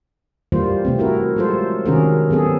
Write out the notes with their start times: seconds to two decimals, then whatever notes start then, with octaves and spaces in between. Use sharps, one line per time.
0.52 E3 G3 A#3 F4 C5
0.85 C3 A3 C4
0.99 E4 F#4 A#4
1.36 F#3 G#3 F4 A4 C5
1.86 C3 D#3 C#4 F#4 G#4 A#4
2.30 F#3 B3 C4 G#4 A4